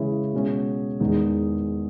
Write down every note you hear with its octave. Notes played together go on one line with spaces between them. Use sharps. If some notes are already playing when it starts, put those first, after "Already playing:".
Already playing: C#3 E3 G#3 C#4 E4
B2 G#3 C#4
E2 D#3 G#3 D#4